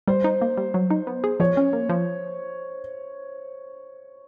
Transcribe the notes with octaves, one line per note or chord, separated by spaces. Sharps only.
G3 C5
D#4
A#3
G3
F#3
D#4
B3
G#4
F3 C#5
C#4
A#3
F3